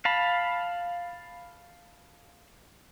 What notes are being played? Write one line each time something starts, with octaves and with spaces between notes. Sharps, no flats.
F5 A5 B5